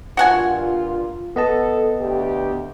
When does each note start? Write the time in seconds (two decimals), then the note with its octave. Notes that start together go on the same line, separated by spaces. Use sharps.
0.17 G2 A#2 F4 F#4 F#5 G#5
1.36 B3 A4 D#5 A5
2.00 D2 G4